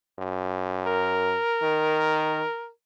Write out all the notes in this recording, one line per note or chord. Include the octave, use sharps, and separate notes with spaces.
F#2
A#4
D#3